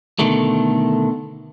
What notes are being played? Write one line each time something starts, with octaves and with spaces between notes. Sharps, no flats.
B2 D3 D#3 A3